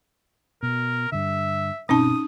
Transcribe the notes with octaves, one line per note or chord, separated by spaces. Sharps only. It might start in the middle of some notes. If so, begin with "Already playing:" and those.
B2 A#4
G2 D3 E5
G1 B2 C4 C#4 D#4 A5 D#6